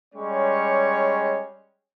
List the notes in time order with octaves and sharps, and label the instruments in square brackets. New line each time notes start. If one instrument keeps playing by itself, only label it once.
[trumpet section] G3 G#3 C#4 C#5